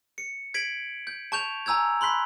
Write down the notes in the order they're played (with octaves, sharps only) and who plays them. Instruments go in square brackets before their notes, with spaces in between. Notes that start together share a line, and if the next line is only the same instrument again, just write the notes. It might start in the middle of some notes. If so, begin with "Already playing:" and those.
[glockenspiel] C#7
G#6 B6 D7 F#7
G6
A5 C#6 G6 F7
G#5 A#5 E6 G6 G#6
B5 C6 F#6 B6